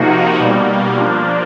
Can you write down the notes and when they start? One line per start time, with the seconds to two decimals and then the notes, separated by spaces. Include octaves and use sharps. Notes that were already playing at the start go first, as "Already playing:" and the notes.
Already playing: C3 F3 A#3 D#4 F#4
0.38 B2 G3 A#3
0.96 F3 A#3 D4